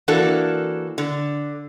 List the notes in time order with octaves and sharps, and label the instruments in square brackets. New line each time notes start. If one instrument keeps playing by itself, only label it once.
[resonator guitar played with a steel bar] E3 A#3 D4 F#4 A4
D3